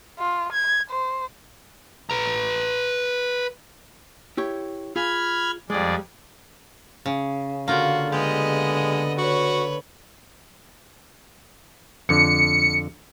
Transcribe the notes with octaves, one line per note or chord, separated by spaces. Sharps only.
F4
G#6
C5
B4 A#5
E4 G4 C#5
F4 G#4 B5 F6 G#6
F2 G3 G#3 G#4 D5
C#3
D3 A#3 F4 F#4 G5
G#3 B3 G4 D#5
F#4 B4 C#5
F2 D3 C#7